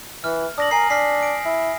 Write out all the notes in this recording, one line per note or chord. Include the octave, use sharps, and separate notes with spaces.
E3 F6
D4 D#6 A#6 F#7
A#4 G#5 C7
D4 F6 B6 C7
D7
E4